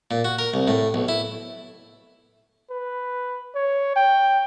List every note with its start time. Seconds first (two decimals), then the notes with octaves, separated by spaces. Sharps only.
0.11 A#2
0.25 F#4
0.39 A#4
0.54 C2
0.68 A2
0.94 B1
1.09 E4
2.71 B4
3.55 C#5
3.96 G5